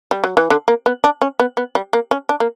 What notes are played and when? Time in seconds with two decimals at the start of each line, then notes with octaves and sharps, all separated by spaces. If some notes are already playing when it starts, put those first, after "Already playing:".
0.11 G3
0.24 F#3
0.37 E3
0.50 D3
0.68 A#3
0.86 B3
1.04 D4
1.22 C#4
1.40 B3
1.57 B3
1.75 G3
1.93 A#3
2.11 C#4
2.29 D4
2.40 A#3